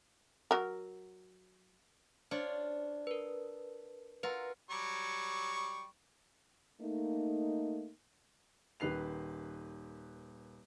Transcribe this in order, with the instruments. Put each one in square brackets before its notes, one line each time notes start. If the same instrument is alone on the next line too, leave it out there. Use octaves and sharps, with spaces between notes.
[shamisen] F#3 A#4
[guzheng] D4 F4 C#5 [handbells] C5
[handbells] A#4 B4
[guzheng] F4 F#4 A#4 [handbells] B4
[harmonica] F#3 G3 C#6
[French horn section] A3 A#3 D#4
[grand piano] D#1 D#3 B4 C7 F7